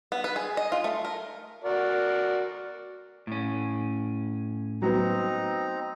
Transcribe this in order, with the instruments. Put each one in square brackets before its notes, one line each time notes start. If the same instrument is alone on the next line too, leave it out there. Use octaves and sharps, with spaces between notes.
[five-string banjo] B3
B4
G#4
D#5
F4
A3
A#4
[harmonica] F#4 A#4 D5
[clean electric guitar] A2 C#4
[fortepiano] F#3 B3 [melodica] C4 D#4 A#5